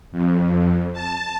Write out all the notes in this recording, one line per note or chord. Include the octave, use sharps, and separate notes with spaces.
F2
A5